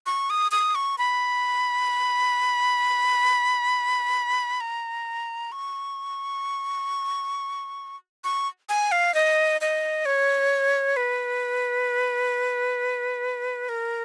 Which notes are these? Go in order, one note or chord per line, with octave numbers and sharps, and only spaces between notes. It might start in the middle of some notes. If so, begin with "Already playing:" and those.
C#6
D#6
D#6
C#6
B5
A#5
C#6
C#6
G#5
F5
D#5
D#5
C#5
B4
A#4